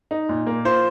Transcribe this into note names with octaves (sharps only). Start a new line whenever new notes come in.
D#4
A#2
A#3
F4 C5